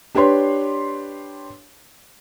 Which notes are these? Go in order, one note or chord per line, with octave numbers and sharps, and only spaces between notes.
D4 G4 B4 C#5 C6